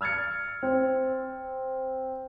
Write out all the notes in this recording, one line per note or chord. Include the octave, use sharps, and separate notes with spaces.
E6 F6 G#6 A6 C#7
C4